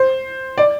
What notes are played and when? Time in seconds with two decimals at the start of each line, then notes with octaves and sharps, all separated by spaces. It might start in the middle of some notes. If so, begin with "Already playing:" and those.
Already playing: C5
0.58 D5